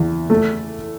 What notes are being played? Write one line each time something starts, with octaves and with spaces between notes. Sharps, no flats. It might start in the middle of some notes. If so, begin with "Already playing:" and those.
Already playing: E2
A3